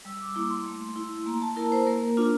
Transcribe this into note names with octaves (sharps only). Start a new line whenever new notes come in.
G3 E6
D6
A#3 E4 D6
C6
A3 C6
E4
A#3 A#5
A5
E4 A#4
C5
A#3 A#4
D4 F4